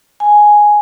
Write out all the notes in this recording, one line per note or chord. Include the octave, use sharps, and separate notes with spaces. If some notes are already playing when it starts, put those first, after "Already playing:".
G#5